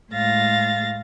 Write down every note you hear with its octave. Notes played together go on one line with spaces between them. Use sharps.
A2 G#3 F5 A6 A#6